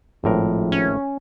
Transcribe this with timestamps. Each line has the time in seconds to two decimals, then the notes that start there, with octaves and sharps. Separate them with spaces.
0.24 G#1 A2 F3 A#4
0.72 C#4